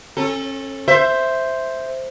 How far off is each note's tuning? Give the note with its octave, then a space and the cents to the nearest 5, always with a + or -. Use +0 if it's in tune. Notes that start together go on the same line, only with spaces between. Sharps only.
C#4 -35 A4 +0
C5 +0 E5 +0